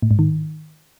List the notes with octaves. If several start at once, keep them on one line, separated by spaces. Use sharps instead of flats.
A2
G#2
D#3